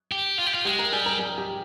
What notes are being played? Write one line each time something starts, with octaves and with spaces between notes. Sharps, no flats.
G4
F4
G4
F4
G#3 G4 G5
A#4 A#5
G3 G#4 G#5
A#4 A#5
G#4 G#5
G4 G5